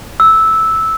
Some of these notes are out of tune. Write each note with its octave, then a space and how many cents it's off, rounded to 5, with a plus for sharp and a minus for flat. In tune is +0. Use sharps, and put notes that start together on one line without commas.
E6 -10